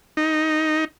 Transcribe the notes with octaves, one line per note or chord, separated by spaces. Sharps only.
D#4